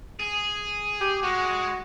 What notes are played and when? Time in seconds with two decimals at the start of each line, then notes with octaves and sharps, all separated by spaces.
0.20 G#4
1.01 G4
1.23 G#3 F#4